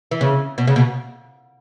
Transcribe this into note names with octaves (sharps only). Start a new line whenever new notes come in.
E3
C#3
B2
C#3
B2